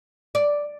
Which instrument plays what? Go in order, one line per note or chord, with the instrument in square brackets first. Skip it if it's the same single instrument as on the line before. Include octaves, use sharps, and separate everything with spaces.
[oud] D5